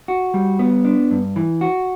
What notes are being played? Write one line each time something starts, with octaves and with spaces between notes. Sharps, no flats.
F#4
G3
B3
D4
G2
E3
F#4